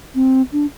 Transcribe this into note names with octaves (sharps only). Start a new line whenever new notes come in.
C4
D4